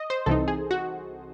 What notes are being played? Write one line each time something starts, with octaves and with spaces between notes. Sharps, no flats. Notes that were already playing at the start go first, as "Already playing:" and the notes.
Already playing: D#5
C5
C2 C3 E3 C4 D#4 A4
G#4
F#4